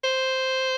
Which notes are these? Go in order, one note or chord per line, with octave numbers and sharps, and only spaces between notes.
C5